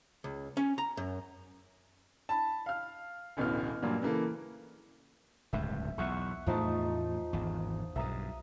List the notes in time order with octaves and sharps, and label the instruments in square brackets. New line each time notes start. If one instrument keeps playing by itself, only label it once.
[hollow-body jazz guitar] C#2
C#4
A#5
F#2
[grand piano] A5 B5
F5 F6
D1 A1 B2 E3 F6
G2 A#2 F#3 A#3
C#3 E3 A#3 A4
[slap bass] D1 C#2 G2 [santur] E5
[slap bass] B1 E2 [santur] E5 F#5 C#6
[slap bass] E2 A2 A3 [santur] F3 D#4
[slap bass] G#1 E2
[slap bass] B1 G2 [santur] E5 A#5 D#6